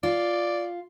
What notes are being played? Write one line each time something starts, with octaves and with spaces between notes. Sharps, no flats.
F4 D5